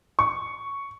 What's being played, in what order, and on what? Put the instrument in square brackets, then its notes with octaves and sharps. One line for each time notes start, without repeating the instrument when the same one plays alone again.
[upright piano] C#6